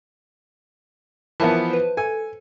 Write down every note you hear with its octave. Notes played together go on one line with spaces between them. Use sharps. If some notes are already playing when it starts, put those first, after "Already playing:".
E3 F3 B3 A#4 E5 A5
B4 C5
A4 G#5